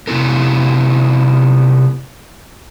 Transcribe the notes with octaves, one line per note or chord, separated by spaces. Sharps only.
C3 B3 E4 A#4